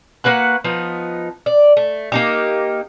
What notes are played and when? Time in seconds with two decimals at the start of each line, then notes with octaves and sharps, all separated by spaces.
0.24 A#3 F#4 B4 F#5
0.64 F3 B3 D#4
1.46 D5
1.77 A3
2.12 A#3 D#4 G4